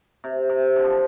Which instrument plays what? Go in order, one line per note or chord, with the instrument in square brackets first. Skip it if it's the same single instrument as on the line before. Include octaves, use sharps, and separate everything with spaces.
[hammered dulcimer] C3
C3
D3
F3